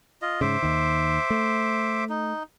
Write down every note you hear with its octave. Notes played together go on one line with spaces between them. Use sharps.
F4 D#5
G#2 C#3 C5 E5 D6
D#2 D#3
A3
D#4